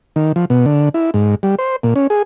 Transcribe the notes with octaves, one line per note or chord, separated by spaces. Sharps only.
D#3
F3
B2
D3
E4
G#2
G3
C5
A#2
C#4
G#4